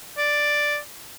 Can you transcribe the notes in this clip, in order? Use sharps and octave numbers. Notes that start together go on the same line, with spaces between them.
D5